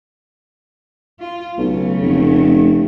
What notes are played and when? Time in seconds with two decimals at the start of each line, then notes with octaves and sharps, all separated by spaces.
1.20 F4
1.58 B1 C#3 A3
2.02 F1